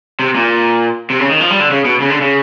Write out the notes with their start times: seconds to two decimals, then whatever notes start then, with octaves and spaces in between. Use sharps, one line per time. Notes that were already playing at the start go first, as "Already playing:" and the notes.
0.20 C3
0.35 A#2
1.10 C3
1.20 C#3
1.30 D#3
1.40 F3
1.50 G3
1.60 D3
1.70 C#3
1.85 B2
2.00 C#3
2.10 D3
2.21 C#3